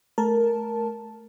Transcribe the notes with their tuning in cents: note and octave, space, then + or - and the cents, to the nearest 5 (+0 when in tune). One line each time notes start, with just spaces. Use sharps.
A3 -25 A#4 +0 A5 -5